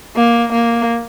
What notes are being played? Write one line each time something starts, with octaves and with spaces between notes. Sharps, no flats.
A#3
A#3